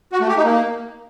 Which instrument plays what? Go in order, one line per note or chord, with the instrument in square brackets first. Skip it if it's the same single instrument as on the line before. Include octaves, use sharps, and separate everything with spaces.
[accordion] F#4
A3
G4
D#4
A#3